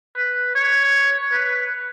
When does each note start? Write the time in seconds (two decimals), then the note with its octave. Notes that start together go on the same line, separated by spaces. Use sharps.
0.16 B4
0.55 C#5
1.32 B4